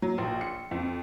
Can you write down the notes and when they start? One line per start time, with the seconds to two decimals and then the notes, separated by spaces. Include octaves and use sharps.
0.02 F#3
0.18 A#1
0.41 C#7
0.71 F2